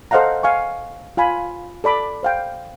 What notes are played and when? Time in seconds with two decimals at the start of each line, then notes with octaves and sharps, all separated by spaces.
0.11 A4 C5 D#5 F5 F#5 A#5
0.43 F5 G#5 C#6
1.17 F4 F5 G#5 B5
1.84 A4 D5 B5 D6
2.23 C5 F5 G5